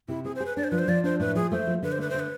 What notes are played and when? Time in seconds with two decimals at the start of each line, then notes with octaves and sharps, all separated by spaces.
0.08 C3 E4
0.24 C4 G#4
0.35 C5
0.40 G#4
0.46 B4
0.57 D4 D5
0.64 C5
0.70 F3 B4
0.79 C5
0.88 F3 D5
1.04 D4 C5
1.20 A2 B4
1.35 F3 G#4
1.52 A3 C5
1.67 F3
1.83 D3 B4
1.92 C5
1.98 A3 B4
2.10 C5
2.14 D3
2.19 B4